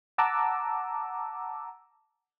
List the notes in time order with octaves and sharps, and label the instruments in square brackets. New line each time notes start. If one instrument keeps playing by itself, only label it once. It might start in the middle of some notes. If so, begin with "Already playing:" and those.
[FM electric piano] F#5 A5 A#5 D6 E6